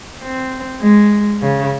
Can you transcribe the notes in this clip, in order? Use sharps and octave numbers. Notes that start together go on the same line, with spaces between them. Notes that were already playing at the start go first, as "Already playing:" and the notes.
C4
G#3
C#3